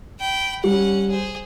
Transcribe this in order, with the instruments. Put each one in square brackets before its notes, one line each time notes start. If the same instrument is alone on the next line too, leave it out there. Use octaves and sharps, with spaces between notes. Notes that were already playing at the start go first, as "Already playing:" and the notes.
[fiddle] G5 B5
[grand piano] G3 [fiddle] C#4 F#5
[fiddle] G#4 C5